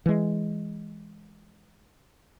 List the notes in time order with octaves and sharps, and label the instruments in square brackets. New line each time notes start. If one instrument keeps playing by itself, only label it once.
[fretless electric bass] E3 G#3